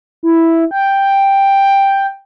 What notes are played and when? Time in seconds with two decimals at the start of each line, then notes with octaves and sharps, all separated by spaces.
0.23 E4
0.71 G5